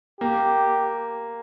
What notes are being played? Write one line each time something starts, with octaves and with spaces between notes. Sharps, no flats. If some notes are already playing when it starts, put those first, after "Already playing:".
A#3 G4